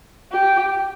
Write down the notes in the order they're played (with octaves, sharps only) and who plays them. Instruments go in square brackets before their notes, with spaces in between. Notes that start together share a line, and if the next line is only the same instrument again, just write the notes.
[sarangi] G4